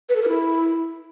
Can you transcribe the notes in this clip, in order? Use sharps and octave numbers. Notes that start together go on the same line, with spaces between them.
B4
A4
A#4
E4